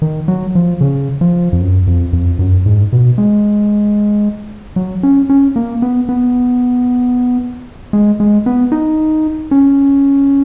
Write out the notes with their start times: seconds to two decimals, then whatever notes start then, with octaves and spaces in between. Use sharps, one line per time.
0.02 D#3
0.28 F#3
0.55 F3
0.81 C#3
1.21 F3
1.53 F2
1.60 F#2
1.87 F2
2.13 F2
2.39 F#2
2.66 G#2
2.92 B2
3.18 G#3
4.76 F#3
5.03 C#4
5.30 C#4
5.56 A#3
5.82 B3
6.09 B3
7.93 G#3
8.20 G#3
8.46 B3
8.72 D#4
9.51 C#4